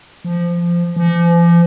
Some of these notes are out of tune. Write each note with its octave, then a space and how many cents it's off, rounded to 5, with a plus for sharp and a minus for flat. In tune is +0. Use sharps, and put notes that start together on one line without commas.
F3 -15
F3 -40